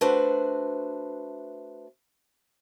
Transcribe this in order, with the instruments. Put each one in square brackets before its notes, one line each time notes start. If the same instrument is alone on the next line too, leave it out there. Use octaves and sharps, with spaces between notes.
[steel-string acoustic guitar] A3 D4 F#4 B4 C5